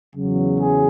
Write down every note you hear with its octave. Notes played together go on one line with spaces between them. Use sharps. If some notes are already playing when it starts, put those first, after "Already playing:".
E2 C#3 F#3
G#4